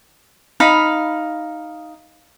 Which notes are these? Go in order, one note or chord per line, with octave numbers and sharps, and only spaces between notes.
D#4 F5 B5